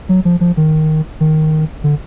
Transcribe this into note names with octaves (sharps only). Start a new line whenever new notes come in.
F#3
F3
F3
D#3
D#3
D3